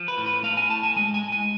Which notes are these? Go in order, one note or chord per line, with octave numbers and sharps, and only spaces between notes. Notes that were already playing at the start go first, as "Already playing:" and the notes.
Already playing: F3
B4
A2
B4
A3 F5
G#5
A2 A5
G#5
G#3 G#5
G#5
G#3
G#5